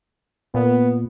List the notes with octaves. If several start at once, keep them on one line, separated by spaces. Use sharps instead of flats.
A#2 B3